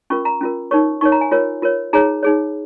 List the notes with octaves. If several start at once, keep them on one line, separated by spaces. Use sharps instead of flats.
C#4 F4 A#4 C#6
A#5
C#4 F4 A#4
D#4 A#4 C#5 C#6
D#4 A#4 C#5 C#6
A#5
G#5
F4 A#4 C#5
F4 A#4 C#5
D#4 G#4 C#5 A#5
D#4 G#4 C#5